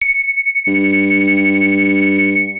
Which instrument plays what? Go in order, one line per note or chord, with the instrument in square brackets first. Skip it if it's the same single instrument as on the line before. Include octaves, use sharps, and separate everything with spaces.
[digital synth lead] C#7
[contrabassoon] G2